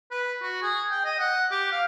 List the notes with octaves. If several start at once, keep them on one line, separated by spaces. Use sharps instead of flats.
B4
F#4
G#4
G5
D#5
F#5
G4
F5